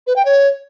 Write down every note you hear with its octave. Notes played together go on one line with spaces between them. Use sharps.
B4
G5
C#5